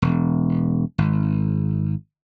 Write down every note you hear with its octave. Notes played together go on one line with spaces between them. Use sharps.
E1
G#1